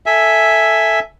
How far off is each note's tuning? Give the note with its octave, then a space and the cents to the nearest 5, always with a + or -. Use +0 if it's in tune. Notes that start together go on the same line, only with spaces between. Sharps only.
A4 +0 E5 +0 G#5 +0